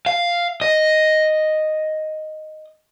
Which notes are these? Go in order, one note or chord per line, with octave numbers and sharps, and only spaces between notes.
F5
D#5